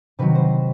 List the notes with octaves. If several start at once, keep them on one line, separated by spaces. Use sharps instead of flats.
C3 D#3 F#3 B4
C5